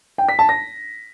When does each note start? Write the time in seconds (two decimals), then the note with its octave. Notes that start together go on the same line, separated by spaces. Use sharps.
0.18 G5
0.29 B6
0.39 A5
0.49 A#6